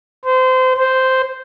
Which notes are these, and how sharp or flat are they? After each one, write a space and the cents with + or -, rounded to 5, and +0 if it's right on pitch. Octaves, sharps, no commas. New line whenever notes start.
C5 -25
C5 -5